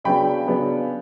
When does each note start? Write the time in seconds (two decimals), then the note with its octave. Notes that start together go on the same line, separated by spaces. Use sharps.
0.04 C#3 F#3 B3 D4 G5 B5
0.48 C#3 F#3 B3 D4